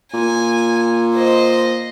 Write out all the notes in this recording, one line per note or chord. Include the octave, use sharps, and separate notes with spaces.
A#2 G#5
C5 D#5